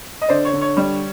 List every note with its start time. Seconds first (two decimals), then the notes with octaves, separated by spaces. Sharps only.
0.21 D#5
0.29 D3 C5 D5
0.45 C#5
0.53 D3
0.61 C#5
0.77 G3